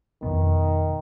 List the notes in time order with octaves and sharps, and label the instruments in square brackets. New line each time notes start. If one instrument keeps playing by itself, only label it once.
[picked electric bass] F2 B2 B3 [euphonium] D#3